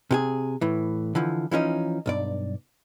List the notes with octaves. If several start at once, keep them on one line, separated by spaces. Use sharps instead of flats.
C3 G4 G#4
A2 E3
D3 E3 F3
E3 F3 C#4 D#4
B1 G2 D5